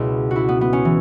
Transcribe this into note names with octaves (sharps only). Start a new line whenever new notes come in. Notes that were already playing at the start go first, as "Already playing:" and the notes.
Already playing: C#2 B2 E4
F#4
E4
B3
B3
C#4
E3